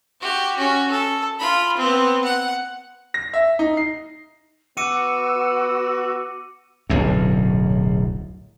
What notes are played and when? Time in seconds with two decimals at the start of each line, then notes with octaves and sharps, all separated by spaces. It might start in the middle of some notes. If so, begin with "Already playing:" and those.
0.21 F#4 G4
0.56 C#4 F#4
0.91 A4
1.39 F4 B5
1.77 B3 C4
2.24 F#5
3.14 A#6
3.34 E5
3.59 D#4
3.77 C7
4.77 B3 F#4 D6 E6 C#7 D#7
6.90 D1 B1 F#2